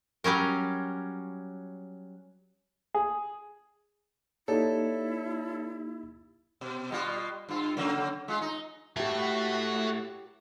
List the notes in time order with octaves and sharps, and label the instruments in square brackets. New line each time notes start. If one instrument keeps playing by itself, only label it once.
[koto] F#3 G3 C#4 A#4
[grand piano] G#4
[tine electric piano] A#3 D#4 G4 [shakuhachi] E4 [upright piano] A4 [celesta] C#5 D5
[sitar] B2
B2 G3 F4
G2 F4
C#3 F#3 A#3
G#3 F4
D#4
[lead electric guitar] A2 [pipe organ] F#4 [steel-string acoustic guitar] G4 A#4 [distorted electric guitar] A4 E5